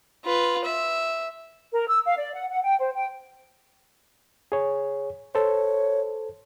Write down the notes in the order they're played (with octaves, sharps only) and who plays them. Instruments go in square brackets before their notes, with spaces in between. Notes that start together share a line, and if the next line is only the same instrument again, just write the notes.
[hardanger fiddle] F4 B4
E5
[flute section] A#4
E6
F5
D5
F#5
F#5
G5
C5
G5
[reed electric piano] G#4 C#5
[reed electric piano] A4 C5 [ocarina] C#5